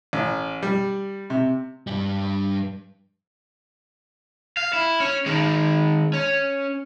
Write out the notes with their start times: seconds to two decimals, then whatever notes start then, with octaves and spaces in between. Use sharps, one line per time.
0.13 A1
0.63 G3
1.30 C3
1.87 G2 G3
4.57 F5
4.73 E4
5.00 C#4
5.26 D#3 G#3
6.14 C#4